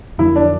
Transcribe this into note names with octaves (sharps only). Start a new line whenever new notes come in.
F2 D3 F#3 A#3 E4
D4